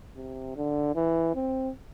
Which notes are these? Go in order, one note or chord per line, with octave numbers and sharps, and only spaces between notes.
C3
D3
E3
C4